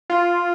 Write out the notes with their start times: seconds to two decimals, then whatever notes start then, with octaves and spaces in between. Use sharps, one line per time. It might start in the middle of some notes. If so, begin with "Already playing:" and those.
0.10 F4